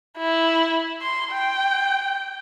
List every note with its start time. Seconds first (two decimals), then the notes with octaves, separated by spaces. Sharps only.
0.18 E4
1.02 C6
1.32 G5